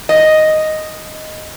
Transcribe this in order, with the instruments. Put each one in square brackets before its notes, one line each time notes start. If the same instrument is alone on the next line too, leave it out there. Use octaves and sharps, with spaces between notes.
[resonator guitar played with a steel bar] D#5